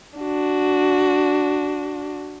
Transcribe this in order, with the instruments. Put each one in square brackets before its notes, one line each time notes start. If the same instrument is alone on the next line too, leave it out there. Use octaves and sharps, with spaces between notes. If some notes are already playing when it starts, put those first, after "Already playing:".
[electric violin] D4 F#4